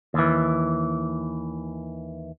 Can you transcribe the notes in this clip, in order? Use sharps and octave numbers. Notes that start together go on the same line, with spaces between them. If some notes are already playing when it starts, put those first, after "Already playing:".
D#2 E3